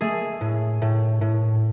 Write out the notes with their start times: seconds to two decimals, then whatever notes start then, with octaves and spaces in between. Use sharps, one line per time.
0.01 A3 G#4
0.41 A2
0.82 A2
1.21 A2